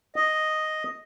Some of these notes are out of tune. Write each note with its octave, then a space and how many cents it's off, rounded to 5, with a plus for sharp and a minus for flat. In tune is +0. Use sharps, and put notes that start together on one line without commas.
D#5 +0